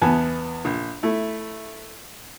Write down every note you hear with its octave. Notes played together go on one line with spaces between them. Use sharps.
E2 B3 G#5 A5
A#1
A3 E4